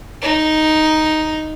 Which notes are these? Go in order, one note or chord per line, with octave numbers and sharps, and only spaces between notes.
D#4